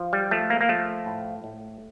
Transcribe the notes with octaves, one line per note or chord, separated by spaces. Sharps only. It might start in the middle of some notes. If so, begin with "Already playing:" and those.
Already playing: F3
G3
F3 A3
A#3
A#3
F3 A3
A2
A2